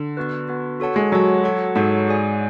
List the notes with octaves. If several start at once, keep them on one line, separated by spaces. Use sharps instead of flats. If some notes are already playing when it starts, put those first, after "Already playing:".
Already playing: D3
B3 F#4 B4
B3 F#4 B4
F#4 A4 C#5 F#5 A5
G#3
F#3 F#4 A4 C#5 F#5 A5
F#4 A4 C#5 F#5 A5
G#2 F#4 A4 C#5 F#5 A5
G#4 D5 G#5